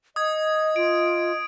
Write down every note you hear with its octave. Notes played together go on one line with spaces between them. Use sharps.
D#5 D#6 G#6
F4 D7